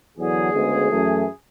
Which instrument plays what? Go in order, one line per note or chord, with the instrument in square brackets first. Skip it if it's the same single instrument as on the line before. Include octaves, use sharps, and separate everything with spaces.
[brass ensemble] E2 D3 F#3 G#4
D2 C#3 G#3 B3
F#2 E3 A3